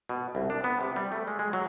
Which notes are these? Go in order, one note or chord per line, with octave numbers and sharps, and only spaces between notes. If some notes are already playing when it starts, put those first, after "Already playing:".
B2
C2
D4
B3
C3
G3
A3
G#3
G#3
F#3